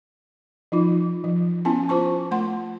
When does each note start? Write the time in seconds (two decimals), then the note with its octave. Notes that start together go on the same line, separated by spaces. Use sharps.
0.72 F3 D#4 F4
1.24 F3
1.65 B3 C#4 E4 G#5 A5
1.89 F4 C5 A5 C#6
2.31 A3 F#5 C6